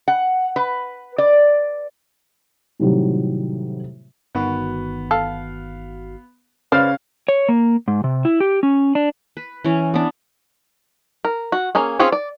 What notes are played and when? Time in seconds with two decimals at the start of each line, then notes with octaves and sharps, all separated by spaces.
0.08 F#5
0.56 B4
1.18 D5
2.79 A2 C3 D#3 F#3 G3 G4
4.35 G1 D#3 B3 F#4
5.11 A4 F5
6.72 C#3 B4 C5 D5 F5 F6 A6
7.28 C#5
7.49 A#3
7.88 G#2
8.04 C3
8.25 E4
8.40 G4
8.63 C#4
8.95 D4
9.37 B4
9.64 E3 C#4
9.94 B3 D4
11.25 A#4
11.52 F#4
11.75 A#3 C#4 G#4
11.99 C4 C#4 F4 G#4 C#5
12.12 D5